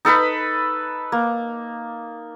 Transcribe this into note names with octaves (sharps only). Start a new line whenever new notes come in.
D#4 A4 B4 B5
A#3